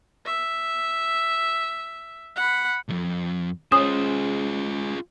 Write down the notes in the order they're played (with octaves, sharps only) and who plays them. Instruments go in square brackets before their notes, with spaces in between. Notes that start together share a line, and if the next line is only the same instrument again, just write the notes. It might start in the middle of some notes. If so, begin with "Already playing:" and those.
[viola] E5
F#5 B5
[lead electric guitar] C2 F2
[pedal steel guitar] G#3 C5 [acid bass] C#4 [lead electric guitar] F4 G#4 [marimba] D#6